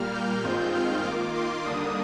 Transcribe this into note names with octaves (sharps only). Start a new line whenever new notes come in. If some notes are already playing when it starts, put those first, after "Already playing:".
Already playing: A#2 G3 A#3 F6
G6
G2 D#3 G#3 C4 F4
F6
D#3 A#3 F4 D6
C6
D#2 D3 G3 A#3 D4 D#6